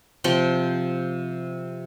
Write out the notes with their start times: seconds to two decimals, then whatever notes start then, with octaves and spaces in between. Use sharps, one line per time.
0.24 C3 F3 G5